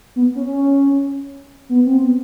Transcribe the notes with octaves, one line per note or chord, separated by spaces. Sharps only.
B3
C#4
C#4
B3
C4
B3